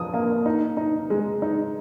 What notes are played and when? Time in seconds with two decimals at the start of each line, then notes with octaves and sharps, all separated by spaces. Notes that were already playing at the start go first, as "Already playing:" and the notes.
Already playing: F3 D#6
0.14 A#3
0.46 D#4
0.77 D#4
1.10 G#3
1.42 D#4